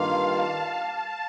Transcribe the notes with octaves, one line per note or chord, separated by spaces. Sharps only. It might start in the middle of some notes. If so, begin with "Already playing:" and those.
Already playing: G2 D#3 A#3 F4 F5
A5
A5